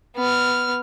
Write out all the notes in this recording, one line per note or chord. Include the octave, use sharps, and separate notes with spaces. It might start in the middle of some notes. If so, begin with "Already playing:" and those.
B3 F6